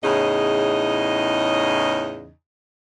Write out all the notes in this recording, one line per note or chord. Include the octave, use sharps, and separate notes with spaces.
E2 A2 C#3 D#4 D#5